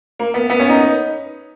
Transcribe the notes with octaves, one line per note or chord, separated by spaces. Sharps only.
A#3
B3
B3
C#4
D#4